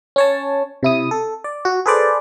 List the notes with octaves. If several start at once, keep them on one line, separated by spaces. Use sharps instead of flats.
C#4 C#5 A5
C3 E4 D#6
A4
D5
F#4
G#4 A4 B4 C5 D5